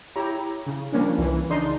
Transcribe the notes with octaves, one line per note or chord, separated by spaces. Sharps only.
E4 G4 C#5 A#5
C#3
F3 G3 A#3 C#4 D4
C2 E3
C#3 D4 D#4 C6